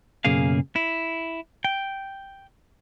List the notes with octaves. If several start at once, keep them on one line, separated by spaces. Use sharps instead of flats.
B1 F#2 C#3 A#3 G#4 F5
E4
G5